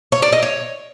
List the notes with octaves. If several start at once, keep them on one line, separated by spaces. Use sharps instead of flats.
C#5
D5
D#5
C#5